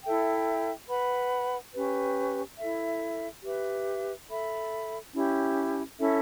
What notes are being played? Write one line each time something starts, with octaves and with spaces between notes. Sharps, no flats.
E4 A4 E5 G5
B4 F#5 B5
C#4 G4 B4
E4 A4 E5
G4 B4 E5
A4 E5 B5
C#4 E4 G4
C#4 E4 A4 E5